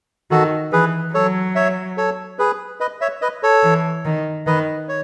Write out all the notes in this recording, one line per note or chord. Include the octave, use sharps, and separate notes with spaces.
D#3 F#4 A4
E3 G#4 B4
F#3 A4 C#5
C#5 E5
A4 C#5
G#4 B4
B4 D#5
C#5 E5
B4 D#5
A4 C#5
E3
D#3
D#3 B4 D#5
C#5